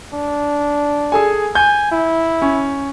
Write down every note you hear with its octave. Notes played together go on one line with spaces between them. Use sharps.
D4
G#4 A4 G#5
G#5 G6
E4
C#4